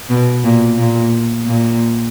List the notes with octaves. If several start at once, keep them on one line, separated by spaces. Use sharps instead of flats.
B2
A#2
A#2
A#2